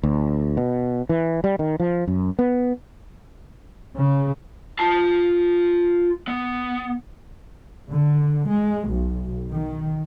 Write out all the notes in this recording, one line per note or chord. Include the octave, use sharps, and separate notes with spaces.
D2
B2
E3
G3
D#3
F3
F#2
B3
C#3
F4 A5
B3
D3
G#3
B1
D#3